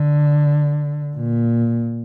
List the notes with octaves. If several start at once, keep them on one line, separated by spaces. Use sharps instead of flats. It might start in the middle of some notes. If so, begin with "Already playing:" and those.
Already playing: D3
A#2